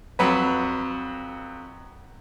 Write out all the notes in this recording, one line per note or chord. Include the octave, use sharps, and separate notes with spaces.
F2 F#3 B4